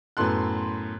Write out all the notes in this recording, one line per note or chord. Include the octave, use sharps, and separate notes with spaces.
F#2 A2 B3 A4 C6 F#6